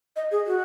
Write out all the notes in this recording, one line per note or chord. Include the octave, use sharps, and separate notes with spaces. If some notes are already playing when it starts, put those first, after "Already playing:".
D#5
G#4
F#4